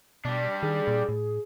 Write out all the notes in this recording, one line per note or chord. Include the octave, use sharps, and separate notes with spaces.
B2 G3 D4
D#3 G#4
A#2
A2